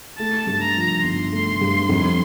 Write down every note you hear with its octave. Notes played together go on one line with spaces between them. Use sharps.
A3 A5
G2
A#5
F3
G1 C6
A3
G2
F2